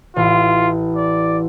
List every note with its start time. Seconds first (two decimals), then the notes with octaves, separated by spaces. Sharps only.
0.16 A1 F4
0.96 D5